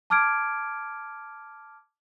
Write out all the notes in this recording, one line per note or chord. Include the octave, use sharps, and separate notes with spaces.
A5 D6 F6 G#6 D7